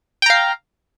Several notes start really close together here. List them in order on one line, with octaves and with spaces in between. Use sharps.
G5 A#5 F5